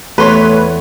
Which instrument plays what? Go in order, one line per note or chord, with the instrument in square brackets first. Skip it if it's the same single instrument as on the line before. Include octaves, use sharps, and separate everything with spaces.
[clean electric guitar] E2 C6 [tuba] A3 [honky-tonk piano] B4 C#5 B5